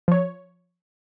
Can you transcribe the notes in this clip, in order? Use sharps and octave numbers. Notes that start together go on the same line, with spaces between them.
F3 C#5